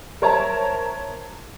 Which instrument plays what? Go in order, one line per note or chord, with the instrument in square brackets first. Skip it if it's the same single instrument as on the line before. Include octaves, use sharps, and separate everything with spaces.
[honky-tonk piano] A#4 C5 C#5 E5 A5 A#5